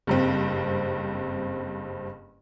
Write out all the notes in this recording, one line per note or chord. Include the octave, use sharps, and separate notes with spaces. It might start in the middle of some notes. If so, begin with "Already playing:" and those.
F#1 G2 C4